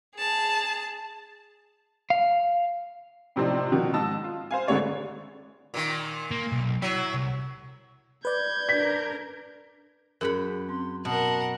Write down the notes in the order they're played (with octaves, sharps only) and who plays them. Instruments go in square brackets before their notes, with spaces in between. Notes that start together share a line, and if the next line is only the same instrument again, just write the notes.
[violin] G#4 A5
[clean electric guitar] F5
[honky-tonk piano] A2 C3 F3 C4 D4 D#4
B2 D#3 F3
G#2 D#5 A5 E6
F4
C5 F5 G#5
G#1 D3 G#3 A3 C#5 D5
[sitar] A#2 D#3
[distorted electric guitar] A#3
B1
[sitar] F#3 [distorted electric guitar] E4
[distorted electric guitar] C2
[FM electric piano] B4 D5 [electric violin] G6 G#6
[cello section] D4 A#4 [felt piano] B6
[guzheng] F#2 F#5 B5 [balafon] G#4 A#4
[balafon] C4 [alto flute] C6
[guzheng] B2 [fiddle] A#4 F#5 [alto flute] A5